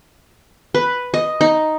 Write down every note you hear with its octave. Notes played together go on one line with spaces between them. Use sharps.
B4
D#5
D#4